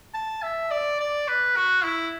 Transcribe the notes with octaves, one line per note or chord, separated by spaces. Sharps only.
A5
E5
D5
D5
B4
F#4
E4